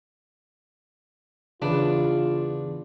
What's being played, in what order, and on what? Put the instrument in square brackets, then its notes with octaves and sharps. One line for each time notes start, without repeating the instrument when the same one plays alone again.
[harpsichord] E2 B4 [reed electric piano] C#3 [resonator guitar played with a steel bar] D4 [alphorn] F4